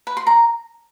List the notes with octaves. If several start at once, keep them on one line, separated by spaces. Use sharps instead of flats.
B4
C6
A#5